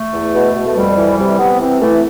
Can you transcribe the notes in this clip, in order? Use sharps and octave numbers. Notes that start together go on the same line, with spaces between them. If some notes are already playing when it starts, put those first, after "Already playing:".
Already playing: A3
E2
B2
B2
A3
F2 G3
E3
C3 G3
C3 B3
E3 C4
E3 A3